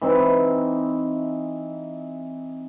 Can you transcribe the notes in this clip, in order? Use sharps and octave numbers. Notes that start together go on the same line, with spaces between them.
E3 C4 D#4 E5